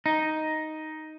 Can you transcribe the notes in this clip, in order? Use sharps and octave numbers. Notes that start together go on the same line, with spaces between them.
D#4